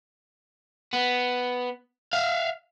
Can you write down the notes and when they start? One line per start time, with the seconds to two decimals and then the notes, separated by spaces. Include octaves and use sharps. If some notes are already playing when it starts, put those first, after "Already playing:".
0.93 B3
2.13 E5 F5